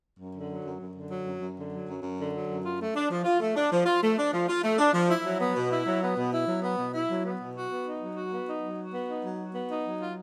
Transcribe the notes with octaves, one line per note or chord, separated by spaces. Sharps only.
F#2
D3
F#3
F#2
F#2
D3
F#3
F#2
F#2
D3
F#3
F#2
F#2
D3
F#3
F#2
F4
A3
D4
F3
F4
A3
D4
F3
F4
A3
D4
F3
F4
A3
D4
F3
E4
F#3
B3
B2
E4
F#3
B3
B2
E4
F#3
B3
B2
E4
F#3
B3
B2
F#4
B3
D#4
F#3
F#4
B3
D#4
F#3
F#4
B3
D#4
F#3
F#4
B3
D#4
F#3
F4